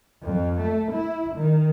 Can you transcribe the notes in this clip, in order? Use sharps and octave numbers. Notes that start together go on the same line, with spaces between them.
F2
A3
E4
D#3